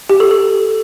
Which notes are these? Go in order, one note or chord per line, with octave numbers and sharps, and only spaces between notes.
G4
A4
A4